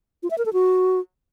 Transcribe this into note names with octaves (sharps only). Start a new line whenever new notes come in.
F4
E5
A#4
A4
F#4